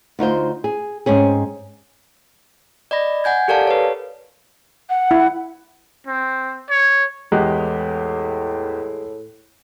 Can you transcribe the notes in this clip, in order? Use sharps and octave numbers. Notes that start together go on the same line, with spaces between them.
D2 D#4 F4 C5
G#4
G#2 C4 C#4 G#4
D5 D#5 B5 A#6
F#5 G#5 G6 G#6
G4 A4 A#4 D5 F5 A5
B4 C#5
F#5
E4
C4
C#5
E2 A2 G#3 G4 F#6